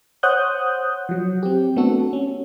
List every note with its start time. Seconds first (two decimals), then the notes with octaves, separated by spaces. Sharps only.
0.23 C5 C#5 F#5 D#6 F#6 G6
1.09 F3 F#3
1.43 C4 G4
1.76 A3 B3 C4 D4 F#4 A4
2.13 C#4